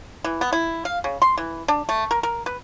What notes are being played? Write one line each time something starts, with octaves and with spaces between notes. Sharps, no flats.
E3
B3
E4
F5
C#3
C6
E3
D4
A3
A#4
A#4
B4